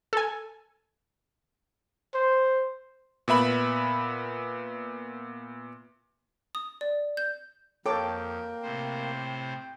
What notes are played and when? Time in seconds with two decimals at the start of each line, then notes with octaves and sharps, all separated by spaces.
0.13 A4 G#5
2.14 C5
3.28 A#2 B3 E5 B5
6.55 D#6
6.81 D5
7.17 G6
7.86 F2 A#3 A4 C#5 G5 D6
8.63 A2 C3 C5